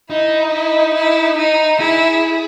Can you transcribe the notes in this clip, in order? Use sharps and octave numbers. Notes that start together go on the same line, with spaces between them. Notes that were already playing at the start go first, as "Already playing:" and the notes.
D#4 E4
E4
E4
D#4
E4 G#4